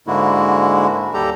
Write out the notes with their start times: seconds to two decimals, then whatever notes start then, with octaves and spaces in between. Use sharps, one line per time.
0.07 G#2 D3 G#3 A#3 E4 F#4
1.14 D#2 G3 G4 A4 A#5